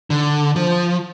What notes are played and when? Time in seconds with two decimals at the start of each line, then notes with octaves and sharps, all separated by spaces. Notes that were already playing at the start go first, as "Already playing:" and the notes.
0.10 D3
0.56 F3